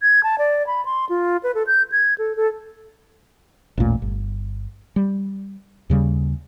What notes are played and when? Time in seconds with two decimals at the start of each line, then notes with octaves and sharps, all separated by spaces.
0.02 G#6
0.23 A5
0.38 D5
0.67 B5
0.85 C6
1.09 F4
1.43 B4
1.55 A4
1.67 G6
1.92 G#6
2.18 A4
2.37 A4
3.78 A1 D#2 A#2 A3
4.02 G1
4.96 G3
5.90 D#2 C#3 G3